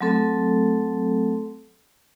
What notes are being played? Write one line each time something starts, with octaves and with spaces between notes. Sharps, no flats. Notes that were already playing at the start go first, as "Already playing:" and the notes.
F#3 A3 C4 A4